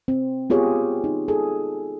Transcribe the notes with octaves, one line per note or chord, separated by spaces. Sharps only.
C4
B3 F4 G4 G#4 C#5
D#4
G#4 A4